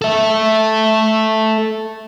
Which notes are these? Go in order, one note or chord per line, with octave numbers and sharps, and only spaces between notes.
A4 E5